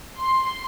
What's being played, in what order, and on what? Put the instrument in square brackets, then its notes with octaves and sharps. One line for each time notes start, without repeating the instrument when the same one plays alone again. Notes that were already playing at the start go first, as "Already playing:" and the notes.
[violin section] C6